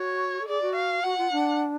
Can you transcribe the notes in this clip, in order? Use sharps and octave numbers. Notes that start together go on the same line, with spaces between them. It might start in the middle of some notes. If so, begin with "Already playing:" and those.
Already playing: F#4 C#5
A4
G#4 D5
F#4
F5
F#4 F#5
F4
D4